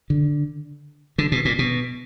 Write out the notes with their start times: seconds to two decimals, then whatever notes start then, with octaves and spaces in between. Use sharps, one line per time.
0.10 D3
1.18 D3
1.32 B2
1.45 A#2
1.59 B2